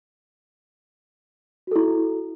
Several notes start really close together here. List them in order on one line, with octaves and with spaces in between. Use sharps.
F#4 A4 E4